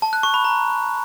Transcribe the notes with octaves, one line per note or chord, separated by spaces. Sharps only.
A5
F#6
C#6
B5
A#5